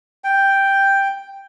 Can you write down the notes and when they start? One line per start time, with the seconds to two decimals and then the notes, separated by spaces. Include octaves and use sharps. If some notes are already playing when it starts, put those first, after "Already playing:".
0.24 G5